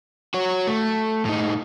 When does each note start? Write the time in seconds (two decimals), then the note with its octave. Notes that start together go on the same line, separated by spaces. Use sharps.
0.34 F#4 C#5
0.67 A3
1.25 A2 D#4